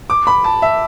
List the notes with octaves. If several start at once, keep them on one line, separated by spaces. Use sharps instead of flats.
D6
B5
A5
E5